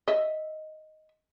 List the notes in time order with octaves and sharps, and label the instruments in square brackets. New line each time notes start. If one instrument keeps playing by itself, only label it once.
[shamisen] D#5 E5